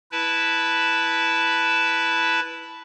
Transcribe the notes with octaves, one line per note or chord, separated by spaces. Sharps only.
E4 B4 A5